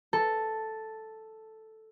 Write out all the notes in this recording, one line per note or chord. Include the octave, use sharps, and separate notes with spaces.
A4